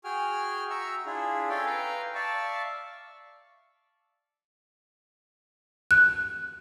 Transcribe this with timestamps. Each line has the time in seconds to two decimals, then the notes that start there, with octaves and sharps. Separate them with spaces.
0.04 F#4 G#4 G5 G#5 F6
0.70 F#4 E5 A#5 C#6 E6
1.06 D4 E4 F4 G#4
1.49 C#4 A4 C#5 F5 G5 G#5
1.66 B4 F5 G5 A#5
2.15 D5 E5 F5 A5 C#6
5.91 F#6